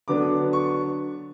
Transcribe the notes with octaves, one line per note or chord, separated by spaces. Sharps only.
D3 F#3 B3 D4 D6
C#6